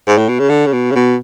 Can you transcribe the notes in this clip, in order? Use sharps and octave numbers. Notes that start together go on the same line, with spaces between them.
G#2
A2
B2
C#3
D3
C#3
B2
C#3
B2